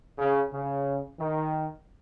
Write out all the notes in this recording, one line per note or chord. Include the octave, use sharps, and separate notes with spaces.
C#3
C#3
D#3